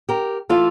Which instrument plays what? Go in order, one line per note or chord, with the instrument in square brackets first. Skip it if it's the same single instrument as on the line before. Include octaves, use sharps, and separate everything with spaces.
[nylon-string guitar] G4 A#4
E3 A3 F4 A4